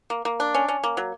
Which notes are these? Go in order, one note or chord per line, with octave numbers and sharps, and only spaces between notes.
A#3
A#3
D4
C#4
C#4
A#3
F#3